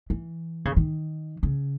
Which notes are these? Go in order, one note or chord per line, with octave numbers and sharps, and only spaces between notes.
E3
C#3
D#3
C#3